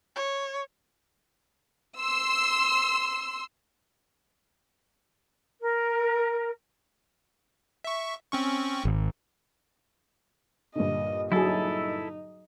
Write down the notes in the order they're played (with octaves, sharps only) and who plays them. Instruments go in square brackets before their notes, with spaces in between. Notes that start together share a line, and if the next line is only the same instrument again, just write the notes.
[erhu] C#5
[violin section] C6 E6
[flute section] A#4
[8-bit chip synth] E5 C#6
C4 C#4 C#6
[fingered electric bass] G#1
[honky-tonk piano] G2 A#2 D3 [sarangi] D#5
[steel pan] F#3 G#4 [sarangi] D#4 [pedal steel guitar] E4 A4